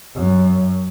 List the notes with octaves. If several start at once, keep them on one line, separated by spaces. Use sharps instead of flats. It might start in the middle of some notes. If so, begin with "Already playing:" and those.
F#2